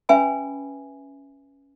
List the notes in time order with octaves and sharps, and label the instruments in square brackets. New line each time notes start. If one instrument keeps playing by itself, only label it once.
[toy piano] C#4 B4 E5 G#5 B5